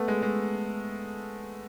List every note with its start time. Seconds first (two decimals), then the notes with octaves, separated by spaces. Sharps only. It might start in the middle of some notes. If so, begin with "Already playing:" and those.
Already playing: A3 B3
0.08 G#3
0.22 G#3